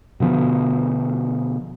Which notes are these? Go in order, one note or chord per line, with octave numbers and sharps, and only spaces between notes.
B2 D3 F3 B3